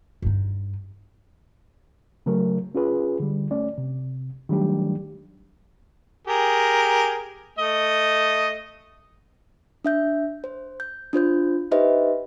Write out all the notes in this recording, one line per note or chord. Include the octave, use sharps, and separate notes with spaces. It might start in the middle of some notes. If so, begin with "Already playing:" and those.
G2 D#4
C#3 F#3 A3 A#4
C#4 F4 G#4 B4
D3 G3
A3 C#4 D5
C3
D#3 F#3 G3 A3 D4 G4
G4 G#4 A#4
A3 D#5
D4 E5 G6
C5
G6
D4 F4 C5 G6
D#4 G4 B4 C5 D#5 E5